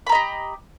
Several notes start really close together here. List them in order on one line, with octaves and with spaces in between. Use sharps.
B5 A#5 D#5 G4